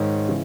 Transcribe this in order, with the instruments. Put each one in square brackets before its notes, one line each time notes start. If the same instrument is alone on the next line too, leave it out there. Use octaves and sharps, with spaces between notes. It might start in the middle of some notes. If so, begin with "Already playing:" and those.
Already playing: [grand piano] G#2 D#3 C#5
C#3 E3